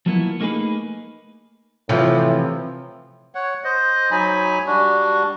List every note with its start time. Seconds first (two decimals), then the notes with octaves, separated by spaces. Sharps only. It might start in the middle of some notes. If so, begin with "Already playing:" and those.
0.06 F3 F#3 A#3 B3 E4
0.40 A3 A#3 D#4 F#4 G#4 B4
1.89 A2 C3 E3 F3
3.35 C#5 F#5
3.64 C5 D#5
4.11 F#3 D#4 G#5 B5
4.66 G3 D4 F#4